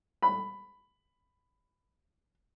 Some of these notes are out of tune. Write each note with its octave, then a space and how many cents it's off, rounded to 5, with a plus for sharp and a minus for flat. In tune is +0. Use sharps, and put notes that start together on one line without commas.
B5 +10